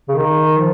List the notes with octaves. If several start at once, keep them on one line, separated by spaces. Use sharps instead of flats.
C#3
D#3
F3